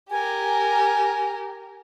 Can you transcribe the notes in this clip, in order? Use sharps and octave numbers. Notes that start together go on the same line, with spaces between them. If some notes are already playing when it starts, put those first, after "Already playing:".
G4 A#4 G#5